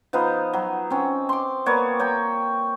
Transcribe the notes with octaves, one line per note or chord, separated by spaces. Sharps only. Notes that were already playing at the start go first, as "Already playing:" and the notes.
F3 B3 D#4 F5
F#3
C4 C#4
C6 D6
A#3 B3 C#5 D5
C#5 G5 A#5